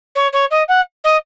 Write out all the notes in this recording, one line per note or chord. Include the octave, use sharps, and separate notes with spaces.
C#5
C#5
D#5
F#5
D#5